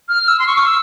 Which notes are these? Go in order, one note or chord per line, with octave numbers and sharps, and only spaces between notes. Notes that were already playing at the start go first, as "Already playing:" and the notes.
F6
E6
C6
C#6
F6
E6